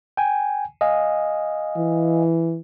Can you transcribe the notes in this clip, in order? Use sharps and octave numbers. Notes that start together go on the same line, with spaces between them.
G5 G#5
D#5 F5 G#5
E3